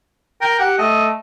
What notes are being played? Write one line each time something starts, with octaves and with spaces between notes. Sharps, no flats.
A#4 G5
G4 F#5
A3 D#5